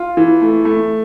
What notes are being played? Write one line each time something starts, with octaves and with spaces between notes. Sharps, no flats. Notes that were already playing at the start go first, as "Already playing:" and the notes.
Already playing: F4
E3
A3
A3